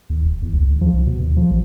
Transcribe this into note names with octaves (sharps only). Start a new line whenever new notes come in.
D#2
E1
E2
C#2
D#2
F3
C2
B2
D#2
F3
A#1